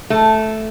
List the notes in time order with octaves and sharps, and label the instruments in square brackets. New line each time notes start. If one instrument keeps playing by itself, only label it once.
[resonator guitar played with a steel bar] A3